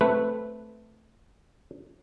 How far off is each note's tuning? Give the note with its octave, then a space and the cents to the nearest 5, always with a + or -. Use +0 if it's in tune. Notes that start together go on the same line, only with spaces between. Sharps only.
A3 +0 C4 +0 B4 +0